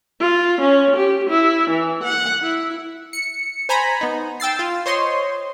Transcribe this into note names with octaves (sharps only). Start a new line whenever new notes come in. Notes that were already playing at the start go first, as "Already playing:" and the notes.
F4
C#4
G4
E4
E3
F#5
E4
C#7
C5 G#5 A#5 B5
B3 D#4
G5 E6 A6 C7
F4
C5 C#5 D#5 C6